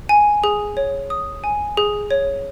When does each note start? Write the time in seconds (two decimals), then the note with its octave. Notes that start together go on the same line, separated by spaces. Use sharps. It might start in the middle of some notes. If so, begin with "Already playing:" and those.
0.09 G#5
0.44 G#4
0.77 C#5
1.10 D#6
1.44 G#5
1.77 G#4
2.11 C#5